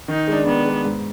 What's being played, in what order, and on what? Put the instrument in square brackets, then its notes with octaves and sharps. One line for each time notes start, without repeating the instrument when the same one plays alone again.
[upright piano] D#3 [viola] D#4
[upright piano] G#3 D4
[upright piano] D#3 [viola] B3
[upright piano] G#3 D4
G#2